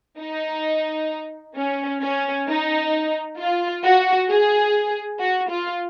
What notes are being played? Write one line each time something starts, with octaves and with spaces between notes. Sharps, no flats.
D#4
C#4
C#4
D#4
F4
F#4
G#4
F#4
F4